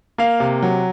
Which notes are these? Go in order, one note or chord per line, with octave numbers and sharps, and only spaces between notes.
A#3 F5
C3
F#3